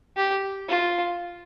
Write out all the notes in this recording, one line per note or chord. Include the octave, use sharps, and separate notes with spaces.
G4
F4